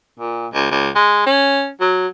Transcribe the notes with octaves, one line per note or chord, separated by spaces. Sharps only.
A#2
C#2
C#2
G#3
C#4
F#3